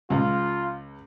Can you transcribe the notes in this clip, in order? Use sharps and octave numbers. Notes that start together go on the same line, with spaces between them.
C#2 F4